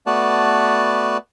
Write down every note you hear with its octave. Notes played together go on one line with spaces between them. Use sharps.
A3 B3 F#4 B4 D5 A5